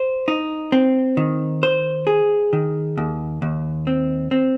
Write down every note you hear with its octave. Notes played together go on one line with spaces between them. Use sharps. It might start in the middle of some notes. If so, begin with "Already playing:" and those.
Already playing: C5
D#4
C4
D#3
C5
G#4
D#3
D#2
D#2
C4
C4